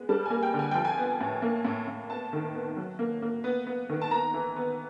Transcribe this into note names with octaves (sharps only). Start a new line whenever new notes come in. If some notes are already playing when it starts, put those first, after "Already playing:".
Already playing: G#3 B3
G3 A5
A#3 G#5
G5
D3
G#5
F3 G5
G#5
B3
A2
A#3
A2
A2
B3 A5
D#3
B3
F#3
A#3
A#3
B3
B3
D#3
A5
B3 A#5
E3
B3